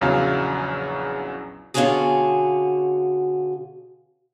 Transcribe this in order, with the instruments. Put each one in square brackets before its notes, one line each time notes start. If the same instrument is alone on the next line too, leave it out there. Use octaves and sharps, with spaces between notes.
[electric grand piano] A#1 E2 C#3 F#3 F5
[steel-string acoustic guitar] B2 D3 C#4 F4 F#4 G#4